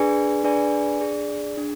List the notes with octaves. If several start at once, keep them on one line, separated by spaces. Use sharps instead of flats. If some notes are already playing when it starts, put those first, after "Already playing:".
Already playing: D4 G#4 B4 D5 G#5
D4 G#4 B4 D5 G#5
D4 G#4 D5
D4 G#4